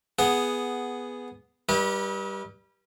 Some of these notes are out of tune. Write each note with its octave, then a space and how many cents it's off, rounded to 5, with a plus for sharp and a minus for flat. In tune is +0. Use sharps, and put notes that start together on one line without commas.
B3 +0 G#4 +0 F#5 +0
G3 +0 D#4 +45 B4 -35